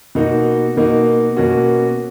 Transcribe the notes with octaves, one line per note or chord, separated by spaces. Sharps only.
B2 A#3 D#4 F#4
B2 A#3 D#4 F#4
B2 A#3 C#4 F#4